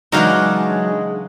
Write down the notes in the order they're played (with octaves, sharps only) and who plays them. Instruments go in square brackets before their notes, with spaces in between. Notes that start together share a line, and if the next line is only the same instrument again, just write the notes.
[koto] C#3 E3 D4 [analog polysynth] F#3 [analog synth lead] G#3 [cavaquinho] D#4 F5 F#5